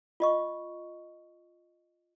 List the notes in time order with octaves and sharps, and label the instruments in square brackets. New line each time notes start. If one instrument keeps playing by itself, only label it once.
[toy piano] F4 D#5 C#6